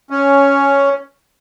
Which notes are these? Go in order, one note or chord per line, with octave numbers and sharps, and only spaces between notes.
C#4